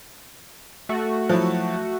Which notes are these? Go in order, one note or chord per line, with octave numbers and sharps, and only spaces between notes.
A3 F#4
F3 F#3 E4